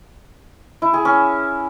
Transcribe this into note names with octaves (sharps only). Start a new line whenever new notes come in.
E4
G#4
C#4